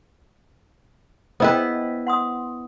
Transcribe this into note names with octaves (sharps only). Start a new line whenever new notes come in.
B3 E4 B4 C5 D#5 G5
F#5 C6 D#6